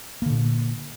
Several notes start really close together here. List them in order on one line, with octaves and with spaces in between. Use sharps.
A#3 D3 A#2